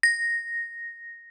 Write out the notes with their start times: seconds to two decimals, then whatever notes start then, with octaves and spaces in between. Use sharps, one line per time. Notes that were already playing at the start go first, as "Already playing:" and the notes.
0.03 A#6